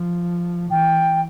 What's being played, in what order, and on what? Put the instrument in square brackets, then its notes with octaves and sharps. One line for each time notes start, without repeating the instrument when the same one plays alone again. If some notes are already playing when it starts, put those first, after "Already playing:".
Already playing: [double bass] F3
[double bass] E3 [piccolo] G5